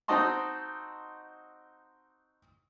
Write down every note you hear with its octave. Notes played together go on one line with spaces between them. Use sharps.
C4 D#4 F#4 D#5 A5 C6